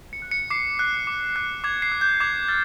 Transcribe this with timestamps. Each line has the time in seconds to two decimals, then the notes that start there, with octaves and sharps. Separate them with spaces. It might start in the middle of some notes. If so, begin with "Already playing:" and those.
0.13 C#7
0.22 F#6
0.31 C#7
0.50 D6 C7
0.79 F#6
1.07 D6
1.36 F#6
1.64 D6 G#6
1.82 C7
1.92 F#6
2.01 G6
2.20 D6 G#6
2.48 F6 A6